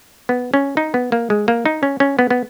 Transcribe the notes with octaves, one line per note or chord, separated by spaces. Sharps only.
B3
C#4
D#4
B3
A#3
G#3
A#3
D#4
C#4
C#4
B3
B3